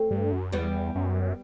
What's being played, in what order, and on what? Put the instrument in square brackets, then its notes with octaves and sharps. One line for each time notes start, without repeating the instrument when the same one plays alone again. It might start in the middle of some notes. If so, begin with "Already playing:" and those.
Already playing: [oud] A3 C4
[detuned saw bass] G2
F#2
[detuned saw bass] E2 [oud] G3 B3
[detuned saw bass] F#2